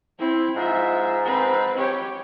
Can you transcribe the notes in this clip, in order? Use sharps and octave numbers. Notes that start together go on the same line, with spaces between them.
C4 E4
G#2 F4 E5
C4 B4
G4 C#5